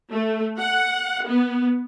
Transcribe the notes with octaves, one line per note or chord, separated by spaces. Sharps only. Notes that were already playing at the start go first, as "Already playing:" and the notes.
A3
F#5
B3